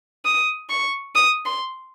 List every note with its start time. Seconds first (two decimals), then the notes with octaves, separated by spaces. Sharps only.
0.25 D#6
0.70 C#6
1.15 D#6
1.46 C6